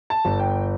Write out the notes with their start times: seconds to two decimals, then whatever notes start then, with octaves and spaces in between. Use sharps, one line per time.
0.10 A5
0.25 G1
0.40 G5